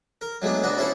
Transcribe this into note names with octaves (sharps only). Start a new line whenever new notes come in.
A#4
F#3 G#3 A3 B3 D4
D2 B3 D4 F#4 D5 D#5
C#4 E4 G#4 A4 C5 D5